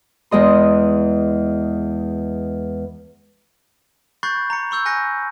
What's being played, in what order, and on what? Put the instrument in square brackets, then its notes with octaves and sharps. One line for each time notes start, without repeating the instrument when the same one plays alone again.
[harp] E2 G#3 D#5 C6
[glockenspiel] B5 C#6 F#6 G6 A6 C7
A#5 C#7
B5 C#6 E6 G6
G#5 F#6 A#6 C#7